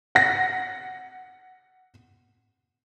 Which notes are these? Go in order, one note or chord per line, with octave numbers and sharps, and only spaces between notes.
F#5 A#6